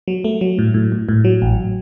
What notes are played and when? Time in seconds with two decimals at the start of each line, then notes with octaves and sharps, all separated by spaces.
0.08 F#3
0.24 A3
0.41 F#3
0.59 A2
0.74 A2
0.92 A2
1.09 A2
1.24 F#3
1.42 A1